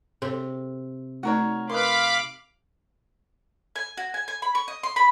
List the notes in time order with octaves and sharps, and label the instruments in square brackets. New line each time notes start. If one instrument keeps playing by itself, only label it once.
[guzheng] C3 [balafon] A4 C5
[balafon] A3 D#4 D5 [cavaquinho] F#4 A#4 C#5
[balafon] A#4 [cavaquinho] B4 D#5 C6 [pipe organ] F5 B5 D6
[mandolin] G#5
F#4
G#5
G#5
B5
C#6
D#5
C6
B5